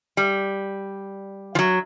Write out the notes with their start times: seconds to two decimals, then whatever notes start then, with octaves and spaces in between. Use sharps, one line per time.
0.17 G3
1.55 F3
1.59 F#3